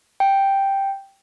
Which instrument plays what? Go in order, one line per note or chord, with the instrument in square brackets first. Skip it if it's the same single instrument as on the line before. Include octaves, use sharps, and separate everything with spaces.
[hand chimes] G5